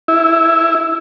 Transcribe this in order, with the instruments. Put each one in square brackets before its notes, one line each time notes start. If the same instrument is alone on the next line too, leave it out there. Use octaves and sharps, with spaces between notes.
[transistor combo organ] E4